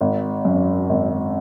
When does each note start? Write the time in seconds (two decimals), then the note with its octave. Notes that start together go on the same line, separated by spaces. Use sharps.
0.01 G#1
0.45 F#2
0.89 G#1